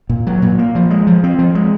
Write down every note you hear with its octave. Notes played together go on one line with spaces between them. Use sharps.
A#2
F#3
A#2
A#3
F3
G#3
F3
C4
F3
G#3